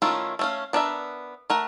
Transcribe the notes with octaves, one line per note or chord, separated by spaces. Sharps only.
D#3 A3 C#4 E4 F4
A3 C#4 F5
B3 D4 A#4 D5 E5
A3 A#4 F#5